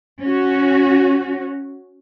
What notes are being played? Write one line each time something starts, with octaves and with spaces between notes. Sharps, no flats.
C#4 F#4